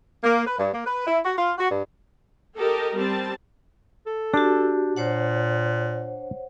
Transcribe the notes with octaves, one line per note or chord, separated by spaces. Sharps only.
A#3
B4
G2
A#3
B4
E4
F#4
F4
F#4
G2
G4 A4 A#4 D#5
G3 C4 A5
A4
D4 F#4 G4
A#2 C5 C#5 F#5